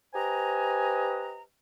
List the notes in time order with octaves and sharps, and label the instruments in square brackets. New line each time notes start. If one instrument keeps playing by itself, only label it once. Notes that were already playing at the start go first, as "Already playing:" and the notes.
[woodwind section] G4 B4 C5 D#5 G#5 A#5